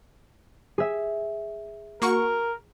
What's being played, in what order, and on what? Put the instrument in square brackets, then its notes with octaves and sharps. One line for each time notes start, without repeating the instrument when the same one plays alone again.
[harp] G#4 E5
[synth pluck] A#3 F#4 C#6 [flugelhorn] A#4